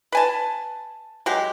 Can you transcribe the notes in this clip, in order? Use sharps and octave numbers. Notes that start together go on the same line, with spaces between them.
B4 G#5 A5
F#3 G#3 G4